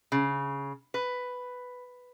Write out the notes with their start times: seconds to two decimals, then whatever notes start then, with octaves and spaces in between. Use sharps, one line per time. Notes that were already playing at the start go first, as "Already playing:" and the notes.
0.12 C#3
0.94 B4